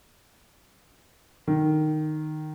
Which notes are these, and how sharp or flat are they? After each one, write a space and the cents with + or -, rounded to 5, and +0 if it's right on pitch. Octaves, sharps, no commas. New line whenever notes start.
D#3 -15